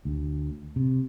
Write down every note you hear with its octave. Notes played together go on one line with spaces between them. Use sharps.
D2
C3